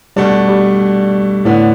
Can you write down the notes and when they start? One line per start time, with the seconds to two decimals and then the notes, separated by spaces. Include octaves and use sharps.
0.16 B2 G3 A3 D4
0.48 G3
1.45 A2 D3 B3 D4